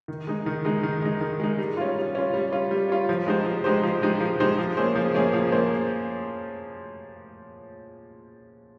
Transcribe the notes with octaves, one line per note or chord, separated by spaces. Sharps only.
D#3
G#3 D#4
D#3
G#3 D#4
D#3
G#3 D#4
D#3
G#3 D#4
G3
C#4 F4
G3
C#4 F4
G3
C#4 F4
G3
C#4 F4
F3
G#3 D#4 G4 C5
F3
G#3 D#4 G4 C5
F3
G#3 D#4 G4 C5
F3
G#3 D#4 G4 C5
F3
A#3 C#4 G#4 C5
F3
A#3 C#4 G#4 C5
F3
A#3 C#4 G#4 C5